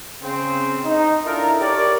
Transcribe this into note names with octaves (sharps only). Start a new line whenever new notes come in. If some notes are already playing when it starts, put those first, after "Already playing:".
C#3 C4
D#4
D4 E4 F4 A4 A#4
G4 A#4 C#5 D5